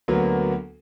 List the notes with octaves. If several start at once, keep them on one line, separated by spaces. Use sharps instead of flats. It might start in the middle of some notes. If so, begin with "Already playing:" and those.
D2 F#3 A#3 B3